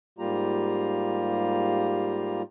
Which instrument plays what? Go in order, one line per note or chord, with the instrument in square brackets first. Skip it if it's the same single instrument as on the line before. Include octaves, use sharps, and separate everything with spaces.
[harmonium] G#2 G3 A#3 F4 G4 A#5